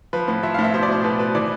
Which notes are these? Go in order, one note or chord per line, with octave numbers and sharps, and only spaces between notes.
F3 B4
A2
F3 E5
F5
A2
E5
B2 C5
D5
B2 C5
B2 B4
B2 B4
E3 D5